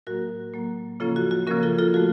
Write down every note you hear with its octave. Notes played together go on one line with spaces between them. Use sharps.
A2 F#3 A#3 F#4 A#4
A2 F#3 A#3
C#3 F3 A#3 C#4 F4 A4
F#4
F#4
C#3 F3 A#3 C#4 F#4 A#4
F4 A4
F4 A4
F3 A3 F#4